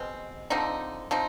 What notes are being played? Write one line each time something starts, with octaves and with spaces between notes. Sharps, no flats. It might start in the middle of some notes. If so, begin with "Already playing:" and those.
Already playing: B2 G#3 C4
D3 F3 C4 D#4
F3 C4 D#4